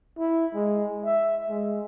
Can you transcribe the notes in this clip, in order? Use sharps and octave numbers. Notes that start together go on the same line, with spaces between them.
E4
G#3
E5
G#3